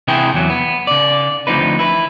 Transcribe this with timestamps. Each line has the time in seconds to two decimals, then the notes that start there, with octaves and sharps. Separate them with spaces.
0.08 C3 E3 B3 E4 G#4 G5
0.34 E2 F#3
0.50 B3
0.87 C#3 D5
1.47 D2 F3 C4 D#4 B4
1.79 E4 B4